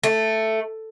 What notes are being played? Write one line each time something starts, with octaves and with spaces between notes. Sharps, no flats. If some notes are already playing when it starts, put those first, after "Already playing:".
A3